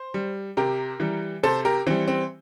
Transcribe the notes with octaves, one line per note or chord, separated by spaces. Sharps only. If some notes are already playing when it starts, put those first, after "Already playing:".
Already playing: C5
G3
C3 G4 A#4
E3 G3
C3 A4 C5
G4 A#4
E3 G3 C4
C4